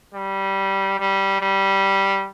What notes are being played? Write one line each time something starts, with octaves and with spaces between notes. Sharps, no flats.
G3
G3
G3